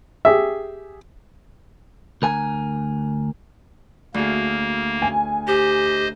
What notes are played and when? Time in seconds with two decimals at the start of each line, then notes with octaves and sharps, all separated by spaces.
0.25 G4 G#4 E5
2.22 D2 A#4 G#5
4.14 D2 A#3 G#4
5.02 G#5
5.47 G4 C5 D#5